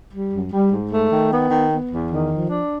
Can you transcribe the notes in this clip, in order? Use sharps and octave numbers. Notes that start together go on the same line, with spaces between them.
G3
F#2
G3
G#2
A3
D#3
B3
D#3
B3
E2
D#3
F3
D4